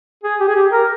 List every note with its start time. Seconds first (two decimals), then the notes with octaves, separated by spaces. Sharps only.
0.24 G#4
0.40 G4
0.48 G#4
0.56 G4
0.72 A#4